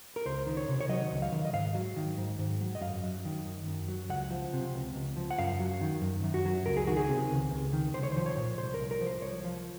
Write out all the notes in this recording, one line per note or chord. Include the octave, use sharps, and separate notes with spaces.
A#4
C#2 C5
D#3
C#5
C3
C#5
F#3 D#5
C#2
F5
D#3
D#5
G#2 F5
F#3
D#3
G#2
G#2
F#3
D#5
F#2 F5
F#3
D#3
F#2
F#2
F#3
C#2 F#5
F3
C3
C#2
C#2
F3
F#5
F#2 F5
F#3
D#3
F#2
F#2
F#4
F#3
C#2 A#4
G#4
D#3 F#4
G#4
C3
C#2
C#2
D#3
C2 C5
C#5
F3 C5
C#5
A#2
C2 C5
A#4
C2
A#4
F3
C5
C2 C#5
F3